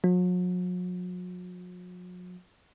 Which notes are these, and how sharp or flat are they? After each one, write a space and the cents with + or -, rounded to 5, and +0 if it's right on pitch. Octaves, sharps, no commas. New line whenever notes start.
F#3 -45